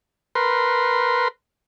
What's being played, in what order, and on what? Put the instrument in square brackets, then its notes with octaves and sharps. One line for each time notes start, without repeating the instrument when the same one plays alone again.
[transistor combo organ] A#4 B4 C6